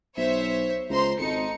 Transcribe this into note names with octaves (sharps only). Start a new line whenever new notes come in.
B1 C5 C#5 E5
C#2 C5 A#5 C6
G#1 D#4 A4 C#7